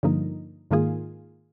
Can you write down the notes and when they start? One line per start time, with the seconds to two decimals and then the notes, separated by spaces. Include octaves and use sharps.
0.03 G2 D3 F3 A#3 D#4
0.71 G#2 D#3 A#3 F4 G#4